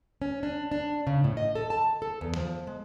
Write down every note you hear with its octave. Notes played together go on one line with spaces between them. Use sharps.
C#4
D4
D4
C#3
A2
D#5
A4
A5
A4
E2
F3
G#3